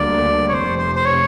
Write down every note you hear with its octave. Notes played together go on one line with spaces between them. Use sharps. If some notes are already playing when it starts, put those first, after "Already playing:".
Already playing: D2 D3 G3 A#3 D5
C#5
F1 F2 C3 C5
C5
C5
C#5